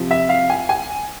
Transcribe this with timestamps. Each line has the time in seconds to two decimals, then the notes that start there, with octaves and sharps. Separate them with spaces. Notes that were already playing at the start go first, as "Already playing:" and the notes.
Already playing: C3 F3
0.11 E5
0.29 F5
0.50 G#5
0.69 G#5